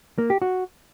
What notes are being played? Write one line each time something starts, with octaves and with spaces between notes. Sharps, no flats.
A#3
G4
F#4